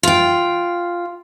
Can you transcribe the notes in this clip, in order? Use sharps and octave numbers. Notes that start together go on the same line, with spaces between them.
F4 G5